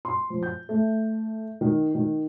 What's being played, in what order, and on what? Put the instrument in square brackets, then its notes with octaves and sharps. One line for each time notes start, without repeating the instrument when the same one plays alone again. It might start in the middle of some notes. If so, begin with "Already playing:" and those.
[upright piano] C6
F3
G6
A3
D#3
D#3